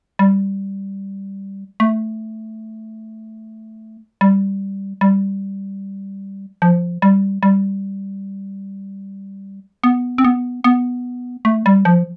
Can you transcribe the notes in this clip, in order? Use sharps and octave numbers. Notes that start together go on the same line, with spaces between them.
G3
A3
G3
G3
F3
G3
G3
B3
C4
B3
B3
A3
G3
F3